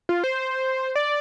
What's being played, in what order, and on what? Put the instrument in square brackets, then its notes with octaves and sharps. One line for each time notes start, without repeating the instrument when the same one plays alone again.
[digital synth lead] F4
C5
D5